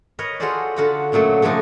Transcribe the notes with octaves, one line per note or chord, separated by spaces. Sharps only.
A#4 B4 C#5 D#5 A#5
F4 F#4 G#4 A4 C5 D5
D3 F4 F#4 F#5 B5
F#2 A#2 F#3 A3 A5
C#3 F3 A3 D4 D#4